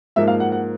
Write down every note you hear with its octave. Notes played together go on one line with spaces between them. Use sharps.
G#2 F3 A#3 E5
F5
F#5
F#5